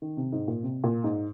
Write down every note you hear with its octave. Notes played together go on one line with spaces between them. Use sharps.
D#3
C3
G#2
A#2
C3
A#2
G#2